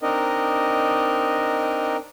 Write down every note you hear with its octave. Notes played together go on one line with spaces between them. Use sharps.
C4 D4 D#4 A#4 D#5